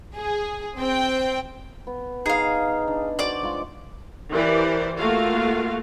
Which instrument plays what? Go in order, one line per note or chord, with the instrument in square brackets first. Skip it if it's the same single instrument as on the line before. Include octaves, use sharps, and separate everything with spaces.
[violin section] G#4
C4 G5
[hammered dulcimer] B3
[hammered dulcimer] D#4 [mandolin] G#4 F5
[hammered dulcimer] D4
[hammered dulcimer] F#4 C5 [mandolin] D5 D6
[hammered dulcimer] G#3 F4 C#6
[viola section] E3 G4 A#4 C5 D5
A3 A#3 F4 F#4 F5